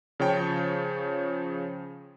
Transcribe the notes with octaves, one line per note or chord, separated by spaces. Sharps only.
C#3 F3 C#5 G5 A5